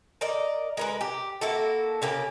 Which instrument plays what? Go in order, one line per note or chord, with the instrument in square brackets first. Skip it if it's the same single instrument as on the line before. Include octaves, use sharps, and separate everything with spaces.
[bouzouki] A#4 D5 D#5
G#3 A#4 B4
G4
A#3 E4 F#4 A4
C#3 A#3 G4